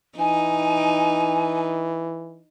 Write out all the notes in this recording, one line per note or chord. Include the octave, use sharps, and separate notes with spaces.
E3 D#4 G#5